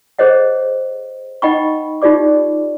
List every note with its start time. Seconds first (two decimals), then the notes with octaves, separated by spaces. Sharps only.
0.19 G#4 A4 C5 C#5 D#5 F#5
1.42 D#4 D#5 F#5 G5 B5 C#6
2.02 D#4 F4 G4 D5 D6